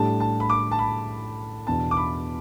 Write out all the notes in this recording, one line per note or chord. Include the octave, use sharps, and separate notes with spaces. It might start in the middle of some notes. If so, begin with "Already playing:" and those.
Already playing: A2 G3 D4 A5
A5
B5
D6
A5
B5
E2 B2 B3 D4 A5
D6
B5